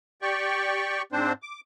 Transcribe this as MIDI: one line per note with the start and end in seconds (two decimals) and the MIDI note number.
0.22 1.02 67
0.22 1.02 74
0.22 1.02 79
0.22 1.02 85
1.12 1.32 44
1.12 1.32 60
1.12 1.32 62
1.12 1.32 72
1.42 1.61 86